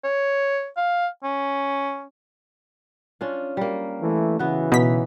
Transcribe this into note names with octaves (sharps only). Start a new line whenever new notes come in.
C#5
F5
C#4
C#4 D4 F4
G3 A#3
E3 A3
C#3 E3 B3 F#4
B2 D#4 B6